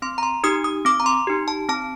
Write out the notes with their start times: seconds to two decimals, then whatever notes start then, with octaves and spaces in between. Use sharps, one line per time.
0.02 C4 C6
0.18 A#5
0.23 C6
0.44 D#4 G4 D#6
0.64 D#6
0.85 C4 D6
1.00 A#5
1.06 C6
1.27 D#4 G4
1.48 A5
1.69 C4 A5